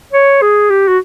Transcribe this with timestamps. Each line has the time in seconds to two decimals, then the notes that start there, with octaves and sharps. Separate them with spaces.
0.13 C#5
0.42 G#4
0.70 G4
0.88 F#4